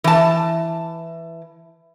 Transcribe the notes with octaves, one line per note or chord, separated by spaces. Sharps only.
E3 A5